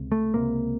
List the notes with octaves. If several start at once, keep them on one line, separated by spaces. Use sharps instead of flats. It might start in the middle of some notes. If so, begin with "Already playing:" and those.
Already playing: C#2 C3
A3
C#2 C3 A#3